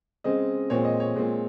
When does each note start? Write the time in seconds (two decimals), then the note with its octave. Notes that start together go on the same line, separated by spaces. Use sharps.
0.24 C#3 G#3 C4 D#5
0.70 A#2 G#3 C4 C#5
0.85 D#5
1.00 C#5
1.16 A#2 G#3 C4